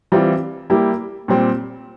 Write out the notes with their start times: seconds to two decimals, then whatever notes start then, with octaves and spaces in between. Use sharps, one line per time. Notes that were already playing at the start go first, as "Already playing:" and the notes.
0.12 E3 G3 C4 F4
0.70 G3 A#3 E4 G4
1.28 A#2 G3 C4